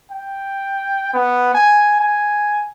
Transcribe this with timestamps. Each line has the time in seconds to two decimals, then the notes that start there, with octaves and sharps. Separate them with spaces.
0.11 G5
1.13 B3
1.54 G#5
2.00 G#5